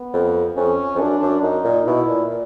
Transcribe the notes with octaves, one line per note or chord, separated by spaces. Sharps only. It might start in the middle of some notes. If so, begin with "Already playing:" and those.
Already playing: B3
F2
F2 C#4
F2
F#2 D4
F#2
F#2 D#4
A#2
B2 E4
A#2
A#2